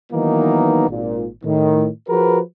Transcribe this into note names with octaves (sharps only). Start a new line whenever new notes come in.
D#3 E3 F#3 A#3 B3 D#4
G#1 A#2
A2 D#3
F3 F#4 G#4 A#4 B4